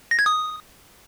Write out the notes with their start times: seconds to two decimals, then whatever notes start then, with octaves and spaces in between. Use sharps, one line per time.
0.11 A#6
0.19 G#6
0.26 D#6